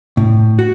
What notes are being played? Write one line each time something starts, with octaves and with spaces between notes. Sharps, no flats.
A2
F#4